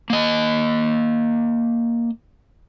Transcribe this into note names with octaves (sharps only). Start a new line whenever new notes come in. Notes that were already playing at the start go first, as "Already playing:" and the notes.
A#3 D#5